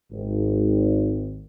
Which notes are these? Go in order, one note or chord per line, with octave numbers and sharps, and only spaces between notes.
G#1